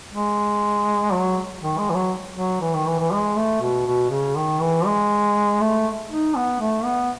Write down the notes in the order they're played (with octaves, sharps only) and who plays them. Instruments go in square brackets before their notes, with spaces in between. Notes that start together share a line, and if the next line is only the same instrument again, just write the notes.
[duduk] G#3
F#3
D#3
G#3
E3
F#3
F#3
E3
D#3
E3
E3
G#3
A3
B2
B2
C#3
D#3
E3
G#3
A3
D#4
B3
A3
B3